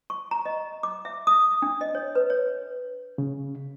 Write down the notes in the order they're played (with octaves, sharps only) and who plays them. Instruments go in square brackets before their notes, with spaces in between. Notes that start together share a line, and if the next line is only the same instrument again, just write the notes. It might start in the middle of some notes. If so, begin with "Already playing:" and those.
[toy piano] C#6
A#5
D#5
D6
E5
D#6
D4
D#5
C#5
B4
C#5
[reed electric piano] C#3